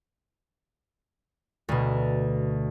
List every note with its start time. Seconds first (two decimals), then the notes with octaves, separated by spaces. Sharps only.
1.69 D2 B2